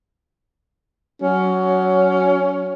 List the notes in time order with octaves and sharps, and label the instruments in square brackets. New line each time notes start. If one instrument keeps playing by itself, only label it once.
[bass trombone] F#3 [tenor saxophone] C#4